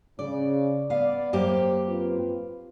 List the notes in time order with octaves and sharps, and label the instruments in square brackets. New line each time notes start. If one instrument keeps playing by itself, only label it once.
[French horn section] C#3 [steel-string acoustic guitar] D5
[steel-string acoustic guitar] B3 F5 [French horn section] D5
[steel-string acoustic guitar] F#2 A#3 G4 [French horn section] C5
[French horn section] C4 F4 B4